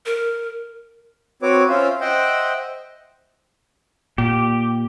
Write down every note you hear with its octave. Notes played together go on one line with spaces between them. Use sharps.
A#4
C4 F#4 B4 C#5 D6
C#4 F4 C5 E5 F5
C5 D#5 E5 F#5 G5
A#2 G4